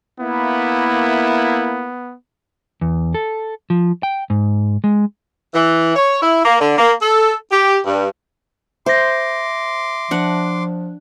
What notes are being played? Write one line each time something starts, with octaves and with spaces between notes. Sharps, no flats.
A#3 B3 E4
E2
A4
F3
G5
G#2
G#3
E3
C#5
E4
A#3
D3
A#3
A4
G4
G2
C5 E5 C6 D6 A#6
F3 D4 F#5